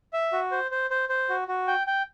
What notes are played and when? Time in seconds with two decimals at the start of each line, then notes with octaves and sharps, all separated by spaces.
0.13 E5
0.33 F#4
0.51 C5
0.71 C5
0.90 C5
1.09 C5
1.29 F#4
1.48 F#4
1.67 G5
1.87 G5